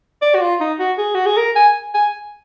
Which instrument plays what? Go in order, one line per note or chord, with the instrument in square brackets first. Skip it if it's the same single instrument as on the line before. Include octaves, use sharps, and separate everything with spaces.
[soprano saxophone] D5
F#4
F4
D#4
F#4
G#4
F#4
G#4
A#4
G#5
G#5